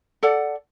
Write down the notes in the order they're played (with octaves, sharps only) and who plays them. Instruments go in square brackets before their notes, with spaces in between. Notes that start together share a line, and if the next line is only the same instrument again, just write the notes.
[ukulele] A4 D5 F#5